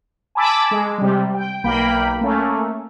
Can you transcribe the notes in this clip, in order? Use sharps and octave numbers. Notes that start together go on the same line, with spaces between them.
G#5 A5 B5 D6 E6
G#3
C3 G3
G5
B1 A#3 G5 B5
A3 A#3 C#4